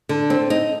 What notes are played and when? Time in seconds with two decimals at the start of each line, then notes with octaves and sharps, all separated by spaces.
0.09 D3
0.30 C4
0.50 D#4